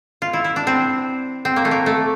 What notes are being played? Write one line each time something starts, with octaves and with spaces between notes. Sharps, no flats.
F4
E4
E4
D4
C4
C4
A#3
A3
A#3
A3